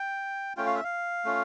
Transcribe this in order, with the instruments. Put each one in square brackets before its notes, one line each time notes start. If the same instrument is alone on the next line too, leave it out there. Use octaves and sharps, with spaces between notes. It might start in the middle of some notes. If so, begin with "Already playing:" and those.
Already playing: [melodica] G5
A3 C#4 F4 G5
F5
E5
F5
A3 C#4 F4